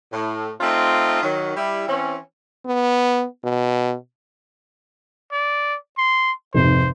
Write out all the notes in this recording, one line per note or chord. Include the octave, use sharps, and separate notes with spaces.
A2
A3 C4 D#4 F4
D#3 F#3
G3 E4
E3 C4 C#4
B3
B2
D5
C6
F1 G#2 C3 C5